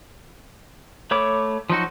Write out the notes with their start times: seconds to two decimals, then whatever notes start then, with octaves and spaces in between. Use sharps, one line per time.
1.11 A3 C#5 B5 D6
1.70 F3 F#3 D#4 F#4